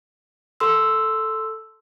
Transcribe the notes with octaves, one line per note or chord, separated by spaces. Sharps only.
A4 C6 E6